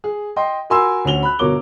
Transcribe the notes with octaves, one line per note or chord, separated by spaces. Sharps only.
G#4
D#5 G5 C6
F#4 A#4 G#5 B5 C6 E6
D2 C#4 F#4 F7 G7
B5 F#6
G1 B2 A#4 C#5 D6 G7